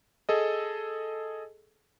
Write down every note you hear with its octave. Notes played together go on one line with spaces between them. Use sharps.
G#4 A4 D#5